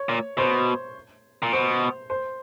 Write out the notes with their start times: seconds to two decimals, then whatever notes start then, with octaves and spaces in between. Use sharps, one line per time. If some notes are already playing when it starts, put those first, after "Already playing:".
Already playing: C#5
0.09 A#2
0.38 B2 C5
1.43 A#2
1.53 B2 C5
2.10 C5